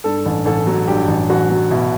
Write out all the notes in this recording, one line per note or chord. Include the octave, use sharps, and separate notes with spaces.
G2 A4
A1
A1 A4
F#3
G2 G4
A1
A1 F#4
F#3
B2 E4